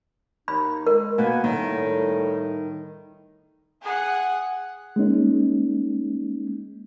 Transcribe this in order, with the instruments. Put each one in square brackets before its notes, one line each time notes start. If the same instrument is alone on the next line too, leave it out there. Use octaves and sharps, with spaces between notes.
[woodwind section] D#2 D#4 [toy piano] B5
[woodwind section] D#3 G#3 [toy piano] A#4
[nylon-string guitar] B2 A#3 B3 [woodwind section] F#5 G#5
[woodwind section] A2 G3 [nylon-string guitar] D#3
[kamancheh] G#4 F#5
[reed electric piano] G#3 A#3 C#4 D#4